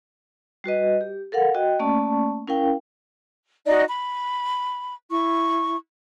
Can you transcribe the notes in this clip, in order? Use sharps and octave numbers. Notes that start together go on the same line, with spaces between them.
G3 F#4 B4 D#5
G4
A4 A#4 F5 F#5
F#4 D#5 G5
A3 A#3 C#4 D5 A5 C#6
C#4 E4 A#4 F5 G5
D#4 F#4 D5 D#5
B5
E4 C#6